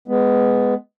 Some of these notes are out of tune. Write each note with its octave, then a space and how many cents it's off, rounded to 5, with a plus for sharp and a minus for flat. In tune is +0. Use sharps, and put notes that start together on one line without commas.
G#3 +0 B3 +15